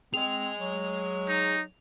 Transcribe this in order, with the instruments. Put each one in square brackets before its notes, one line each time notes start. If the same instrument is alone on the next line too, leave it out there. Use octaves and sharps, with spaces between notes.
[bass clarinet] C4 [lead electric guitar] G#4 D#5 [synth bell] F7
[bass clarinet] F#3
[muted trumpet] D#4